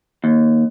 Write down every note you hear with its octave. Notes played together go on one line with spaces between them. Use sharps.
D#2